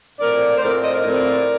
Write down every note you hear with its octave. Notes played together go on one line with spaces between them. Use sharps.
A2 F3 C4 A#4 D5
C5
A2 F3 C4 A#4 D5
C5 D#5
A#4 D5
A2 F3 C4